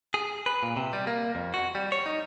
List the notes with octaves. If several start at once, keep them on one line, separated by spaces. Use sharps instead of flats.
G#4
B4
A#2
C3
G3
A#3
F2
F#4
G3
C#5
D#4